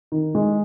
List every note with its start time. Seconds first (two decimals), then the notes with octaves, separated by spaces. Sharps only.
0.12 D#3
0.35 G#3